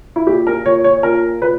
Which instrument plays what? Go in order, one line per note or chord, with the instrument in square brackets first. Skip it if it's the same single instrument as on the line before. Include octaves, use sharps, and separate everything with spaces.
[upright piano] E4
A#2 G4
A#4
A#2 C#5
C#5
A#2 A#4
A#2 B4